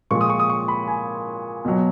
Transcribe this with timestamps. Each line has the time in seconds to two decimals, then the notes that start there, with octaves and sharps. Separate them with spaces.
0.11 A#2 F3 G#3 C#6
0.21 D#6
0.30 C#6
0.40 D#6
0.50 C#6
0.68 B5
0.88 G#5
1.65 B2 F#3